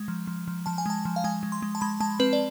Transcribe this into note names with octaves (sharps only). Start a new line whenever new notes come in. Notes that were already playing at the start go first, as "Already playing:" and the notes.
Already playing: G#3
F3
F3
F3
F3 A5
G#5
G#3 A5
F3
F5
G#3 G#5
G#3
C6
G#3
A5
G#3 B5
G#3 A5
C4 B4
D5